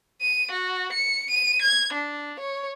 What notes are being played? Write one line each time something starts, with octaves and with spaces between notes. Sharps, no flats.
D#7
F#4
C#7
D#7
G#6
D4
C#5